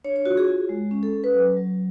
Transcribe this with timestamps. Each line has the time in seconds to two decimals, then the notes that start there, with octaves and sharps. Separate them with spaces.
0.04 D4 C#5
0.16 C#5
0.26 F4 F#4
0.37 G#4
0.48 F4
0.69 G#3
0.91 C#4
1.03 A4
1.13 C#4
1.24 B4
1.34 F#3
1.57 F#3